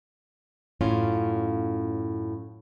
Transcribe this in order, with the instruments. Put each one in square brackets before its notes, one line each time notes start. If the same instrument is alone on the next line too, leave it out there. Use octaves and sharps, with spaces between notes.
[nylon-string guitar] F#2 A2 C#4 F4